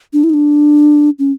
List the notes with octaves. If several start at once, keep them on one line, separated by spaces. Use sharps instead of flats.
D4
E4
D#4
D4
C#4